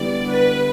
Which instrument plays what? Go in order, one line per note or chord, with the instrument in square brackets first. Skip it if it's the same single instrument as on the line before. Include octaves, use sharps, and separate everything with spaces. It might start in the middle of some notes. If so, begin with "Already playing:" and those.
Already playing: [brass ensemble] D3 G3 B3 E4 [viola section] D5
[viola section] B4